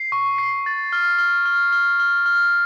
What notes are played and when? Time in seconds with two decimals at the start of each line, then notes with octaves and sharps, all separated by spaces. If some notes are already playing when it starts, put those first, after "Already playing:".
Already playing: C7
0.12 C#6
0.38 C7
0.66 A6
0.93 F6
1.18 F6
1.46 F6
1.72 F6
2.00 F6
2.26 F6